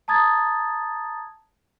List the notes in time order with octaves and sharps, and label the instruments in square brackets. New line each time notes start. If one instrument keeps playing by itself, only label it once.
[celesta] A5 A#5 D#6 G#6 A6